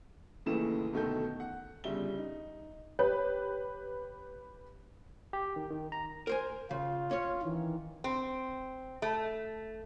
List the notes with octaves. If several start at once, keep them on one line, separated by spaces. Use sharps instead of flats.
F#1 D#2 C#3 E3 A3 E7
D2 B2 D#3 A3 A4 G6
F#5
G1 C#3 G3 E5 G7
D#4
G4 B4 C#5
G4
D#3
D#3
A#5
A#4 C5 G#5
C#3 F4
C#4 C#5
D#3 E3
C4
A3